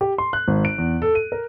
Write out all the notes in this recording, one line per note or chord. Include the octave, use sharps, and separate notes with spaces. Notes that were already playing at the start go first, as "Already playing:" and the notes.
G4
C6
F#6
G#1
D7
E2
A4
D#7
A#4